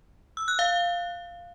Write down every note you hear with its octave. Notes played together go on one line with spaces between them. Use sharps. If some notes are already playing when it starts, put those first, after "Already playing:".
E6
F#6
F5